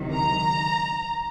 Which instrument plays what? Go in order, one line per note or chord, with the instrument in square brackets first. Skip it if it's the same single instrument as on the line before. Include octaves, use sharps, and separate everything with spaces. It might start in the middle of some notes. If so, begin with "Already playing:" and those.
Already playing: [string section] C#2 C3 D#3 F#3
A#5